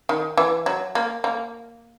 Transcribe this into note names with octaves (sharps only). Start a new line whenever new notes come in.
D#3
E3
F#3
A#3
A#3